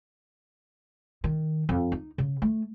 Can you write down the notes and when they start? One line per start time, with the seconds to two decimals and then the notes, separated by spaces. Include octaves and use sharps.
1.24 D#3
1.69 F2
1.92 D#4
2.18 C#3
2.42 A3